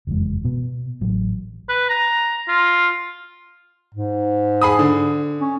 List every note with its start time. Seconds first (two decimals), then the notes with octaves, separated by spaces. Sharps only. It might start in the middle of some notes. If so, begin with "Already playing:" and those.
0.07 F#1 F2 E3 G#3
0.45 B2 B3
1.01 A1 F#3
1.69 B4
1.89 A#5
2.48 F4
3.94 G#2
4.62 G#4 B5 D#6
4.79 D3
5.41 C#4